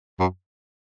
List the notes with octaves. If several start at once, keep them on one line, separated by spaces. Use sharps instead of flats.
F#2